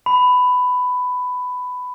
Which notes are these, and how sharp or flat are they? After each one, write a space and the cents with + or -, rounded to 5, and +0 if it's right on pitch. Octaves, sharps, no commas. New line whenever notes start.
B5 +15